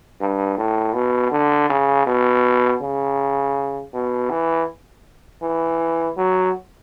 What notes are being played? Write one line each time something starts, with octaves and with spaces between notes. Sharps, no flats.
G2
A2
B2
D3
C#3
B2
C#3
B2
E3
E3
F#3